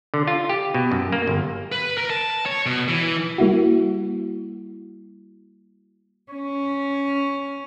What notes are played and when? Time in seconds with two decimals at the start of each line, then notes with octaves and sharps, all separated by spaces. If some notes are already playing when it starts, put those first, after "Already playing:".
0.14 D3
0.28 F4
0.49 G4
0.74 B2
0.92 F#2
1.12 A#3
1.27 G1
1.72 B4
1.97 A#4
2.10 A5
2.46 C#5
2.66 B2
2.88 E3
3.38 G3 A#3 E4 F#4
6.32 C#4